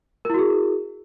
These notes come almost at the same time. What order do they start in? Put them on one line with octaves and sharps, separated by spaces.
A#4 E4 F#4 G#4